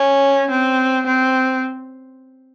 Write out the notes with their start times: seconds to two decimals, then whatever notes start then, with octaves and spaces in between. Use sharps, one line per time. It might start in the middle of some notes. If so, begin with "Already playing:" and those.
Already playing: C#4
0.50 C4
1.07 C4